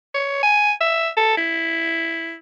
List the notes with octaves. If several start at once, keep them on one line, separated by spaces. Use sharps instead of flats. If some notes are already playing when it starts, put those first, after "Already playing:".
C#5
G#5
E5
A4
E4